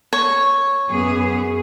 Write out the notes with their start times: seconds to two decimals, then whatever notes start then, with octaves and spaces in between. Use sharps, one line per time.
0.13 C#5
0.90 F#2 B3 G#4